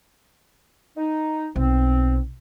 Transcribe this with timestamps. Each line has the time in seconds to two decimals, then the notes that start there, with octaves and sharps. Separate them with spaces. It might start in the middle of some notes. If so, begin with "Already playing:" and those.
0.97 D#4
1.56 B1 C4